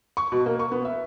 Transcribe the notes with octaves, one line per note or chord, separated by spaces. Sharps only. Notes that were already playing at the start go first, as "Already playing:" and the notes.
C#6
B2
A#3
C#6
B3
E5